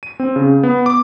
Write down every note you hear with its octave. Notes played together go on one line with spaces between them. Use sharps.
D#7
C4
C#3
B3
D6